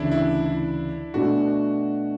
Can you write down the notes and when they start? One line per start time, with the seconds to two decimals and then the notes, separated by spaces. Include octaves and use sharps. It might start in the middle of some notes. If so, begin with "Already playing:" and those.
Already playing: D2 C#3 E3 D4 E4
0.11 E4
0.46 E4
1.14 B2 A3 D4 F#4